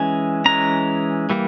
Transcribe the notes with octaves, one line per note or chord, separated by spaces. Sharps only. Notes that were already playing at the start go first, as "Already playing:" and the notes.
Already playing: E3 G#3 C#4 G#5
E3 G#3 C#4 A#5
E3 G3 A#3